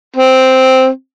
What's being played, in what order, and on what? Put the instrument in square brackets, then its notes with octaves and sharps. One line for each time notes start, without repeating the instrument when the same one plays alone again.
[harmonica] C4